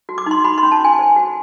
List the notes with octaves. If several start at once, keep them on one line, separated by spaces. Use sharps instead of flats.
F#4
D6
D#4 C6
F#4 B5
C6
C#4
A5
F#4 G#5
C5
F#4